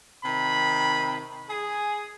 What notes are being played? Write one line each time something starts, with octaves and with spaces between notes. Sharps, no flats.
C3 D#3 B5
G#4